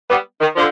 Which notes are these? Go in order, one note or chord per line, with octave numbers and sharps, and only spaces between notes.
G3 B3
D#3
D3 F3